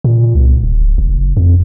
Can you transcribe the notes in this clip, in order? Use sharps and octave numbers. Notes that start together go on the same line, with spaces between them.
A#2
C2
D1
F#1
F2